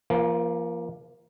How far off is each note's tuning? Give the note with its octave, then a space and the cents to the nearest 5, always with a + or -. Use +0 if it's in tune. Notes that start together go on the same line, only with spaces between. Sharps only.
F3 -25 A#3 +20